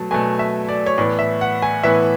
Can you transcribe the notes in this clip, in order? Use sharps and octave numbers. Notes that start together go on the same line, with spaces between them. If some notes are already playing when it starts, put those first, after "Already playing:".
Already playing: B2 F#3 A3 A5
B2 F#3 A3 G#5
E5
D5
C#5
A2 E3 B3 D5
E5
F#5
G#5
A2 E3 B3 E5